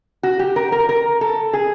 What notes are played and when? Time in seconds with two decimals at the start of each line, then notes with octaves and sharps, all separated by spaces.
0.23 F#4
0.39 G4
0.56 A#4
0.72 A#4
0.89 A#4
1.21 A4
1.53 G#4